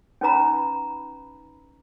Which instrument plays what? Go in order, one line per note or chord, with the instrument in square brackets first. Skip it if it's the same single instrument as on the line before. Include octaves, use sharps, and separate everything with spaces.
[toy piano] C#4 D#4 B4 A#5 B5